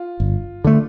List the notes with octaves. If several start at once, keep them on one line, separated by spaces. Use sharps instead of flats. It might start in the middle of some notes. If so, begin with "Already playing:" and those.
Already playing: F4
G1
D3 A3